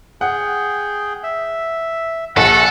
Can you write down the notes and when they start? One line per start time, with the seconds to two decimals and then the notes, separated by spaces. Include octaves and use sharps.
0.21 G#4 F#5 G5
1.23 E5
2.37 A#1 A4 F#5